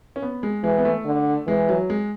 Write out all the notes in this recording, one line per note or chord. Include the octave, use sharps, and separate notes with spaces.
C#4
B3
G#3
E3 G#3
B3
A3
D3
E3 G#3
F#3
G#3